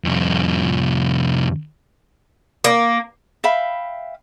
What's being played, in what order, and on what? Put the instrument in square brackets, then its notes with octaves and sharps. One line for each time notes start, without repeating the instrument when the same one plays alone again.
[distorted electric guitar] C2 F2
[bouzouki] A#3
[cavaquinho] E5 F5 G5 B5